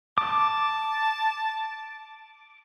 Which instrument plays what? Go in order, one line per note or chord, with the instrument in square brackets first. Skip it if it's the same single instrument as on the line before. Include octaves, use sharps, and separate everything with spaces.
[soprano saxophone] A5 [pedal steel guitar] D6